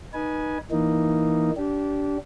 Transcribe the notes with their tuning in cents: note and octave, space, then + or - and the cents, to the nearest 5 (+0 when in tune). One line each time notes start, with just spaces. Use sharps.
D#4 -10 B4 -25 G#5 +10
E3 +0 A#3 +0 D#4 +0
D4 -25 G4 -20